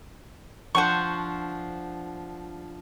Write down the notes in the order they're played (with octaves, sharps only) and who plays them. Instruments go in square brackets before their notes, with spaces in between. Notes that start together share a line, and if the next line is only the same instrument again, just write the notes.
[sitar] F3 D4 [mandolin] C5 F#5 C#6